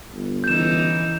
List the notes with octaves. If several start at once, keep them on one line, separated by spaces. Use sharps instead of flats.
G1
C#3 E3 D#4 G6 E7